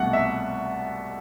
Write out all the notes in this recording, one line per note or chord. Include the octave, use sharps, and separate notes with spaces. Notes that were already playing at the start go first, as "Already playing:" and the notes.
Already playing: C2 B2 A3 F#5
E5